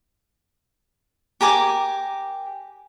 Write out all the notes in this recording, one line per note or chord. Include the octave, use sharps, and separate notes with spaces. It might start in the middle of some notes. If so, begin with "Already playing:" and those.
G4 A#4 G#5 D6